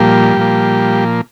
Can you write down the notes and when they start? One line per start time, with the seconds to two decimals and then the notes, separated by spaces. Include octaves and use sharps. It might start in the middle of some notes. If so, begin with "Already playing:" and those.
Already playing: A#2 F3 G3 A#3 G4
0.37 A#2 F3 A#3